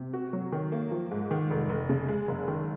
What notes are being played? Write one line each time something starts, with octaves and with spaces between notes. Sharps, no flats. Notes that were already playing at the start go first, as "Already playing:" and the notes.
Already playing: C3
F#4
F#3
D#3
A#3
F3
G#2
D#3
F1
F1
C#3
G#3
F#1
D#3